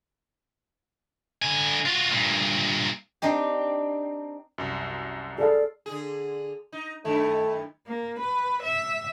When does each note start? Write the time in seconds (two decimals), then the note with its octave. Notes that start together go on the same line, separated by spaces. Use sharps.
1.42 D3 G#5
1.86 F4 F#4
2.11 G2 A#2
3.22 C4 D4 D#4 G4
4.58 C2 F#2
5.38 G#4 A4 D5 F5
5.86 D3 G#4
6.72 D#4
7.05 F#2 D#3 A3 E4
7.87 A#3
8.19 B4
8.63 E5